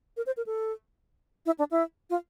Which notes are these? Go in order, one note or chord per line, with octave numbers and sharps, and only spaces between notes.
A#4
C5
A#4
A4
E4
D4
E4
F4